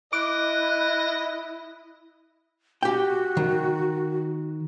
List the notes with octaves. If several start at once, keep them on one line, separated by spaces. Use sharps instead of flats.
E4 D#5 D6 F#6
F#4 G4 G5
D#3